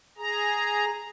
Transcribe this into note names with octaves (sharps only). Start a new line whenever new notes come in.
G#4 A#5